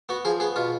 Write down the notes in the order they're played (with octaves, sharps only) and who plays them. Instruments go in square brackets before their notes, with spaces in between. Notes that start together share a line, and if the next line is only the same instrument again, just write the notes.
[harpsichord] B3 F#4
F3 G#4
B3 G#4
B2 F4